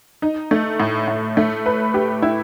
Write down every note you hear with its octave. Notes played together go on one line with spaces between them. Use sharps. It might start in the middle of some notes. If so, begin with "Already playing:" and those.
D#4
A3
A2
A2
A3
B4
G4
E4